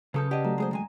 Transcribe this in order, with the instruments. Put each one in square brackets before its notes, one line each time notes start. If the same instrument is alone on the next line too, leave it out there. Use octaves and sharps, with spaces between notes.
[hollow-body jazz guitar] F#2 A4 [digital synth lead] C#3 [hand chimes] B4 D#6 G6
[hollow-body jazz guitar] G4 D#5 [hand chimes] D5 F#5 A5
[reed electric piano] F#3 A3 [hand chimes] A#5
[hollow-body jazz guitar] G#3 G#4 C5
D#3 G#3 G#5